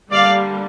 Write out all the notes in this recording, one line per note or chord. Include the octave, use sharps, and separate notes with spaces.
D3 G3 A#3 D5 F5